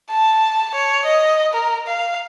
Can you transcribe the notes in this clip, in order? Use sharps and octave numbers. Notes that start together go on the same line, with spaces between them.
A5
C#5
D#5
A#4
F5